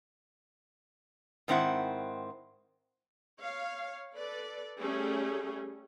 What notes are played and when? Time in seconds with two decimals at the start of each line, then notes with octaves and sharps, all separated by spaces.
1.48 G#2 D#3 C4 E4 F#5
3.40 C#5 F5
4.15 A4 B4 D5
4.80 G3 A3 C#4 G4 G#4